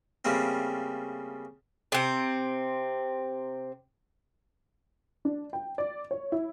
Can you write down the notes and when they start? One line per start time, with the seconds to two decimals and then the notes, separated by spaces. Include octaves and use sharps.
0.25 C#3 G3 A3 A#3 C4
1.92 C3 C4
5.25 D4
5.53 G5
5.78 D5
6.11 C#5
6.32 E4